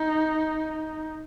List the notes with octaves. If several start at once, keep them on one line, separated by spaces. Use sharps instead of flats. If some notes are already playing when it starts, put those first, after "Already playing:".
Already playing: D#4